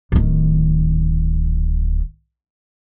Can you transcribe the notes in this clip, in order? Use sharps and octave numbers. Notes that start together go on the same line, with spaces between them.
D1 D#3